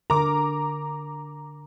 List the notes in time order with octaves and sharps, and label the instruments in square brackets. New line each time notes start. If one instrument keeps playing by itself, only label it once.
[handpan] D3 A#4 [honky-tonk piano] A#5 D6